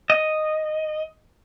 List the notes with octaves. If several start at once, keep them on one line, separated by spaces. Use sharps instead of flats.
D#5